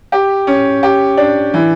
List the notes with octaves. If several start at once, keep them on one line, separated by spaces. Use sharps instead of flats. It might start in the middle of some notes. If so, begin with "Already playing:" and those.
G4
C#4
G4
D4
E3